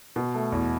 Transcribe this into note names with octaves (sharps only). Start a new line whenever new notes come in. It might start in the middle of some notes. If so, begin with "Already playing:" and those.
B2
A3
E2